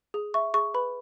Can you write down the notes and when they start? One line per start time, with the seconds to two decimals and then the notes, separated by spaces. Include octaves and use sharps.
0.14 G#4
0.34 E5 C#6
0.54 G#4 C#6
0.74 B4 B5